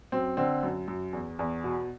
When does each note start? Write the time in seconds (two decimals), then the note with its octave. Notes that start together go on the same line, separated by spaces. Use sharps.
0.12 F#2 C4
0.37 D3 C4
0.63 F#2
0.88 F#2
1.13 E2
1.39 E2
1.64 B2